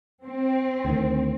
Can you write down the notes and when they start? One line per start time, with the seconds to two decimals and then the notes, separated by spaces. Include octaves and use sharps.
0.25 C4
0.85 D2 D#3